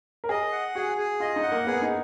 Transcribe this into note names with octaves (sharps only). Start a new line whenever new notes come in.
A#4
G#4 D#5
F#5
F#4 G#4
G#4
F4 D#5
D#4
F#5
A#3
B3 G#4
D#4